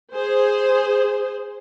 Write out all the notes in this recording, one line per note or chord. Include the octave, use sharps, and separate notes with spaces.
G#4 C5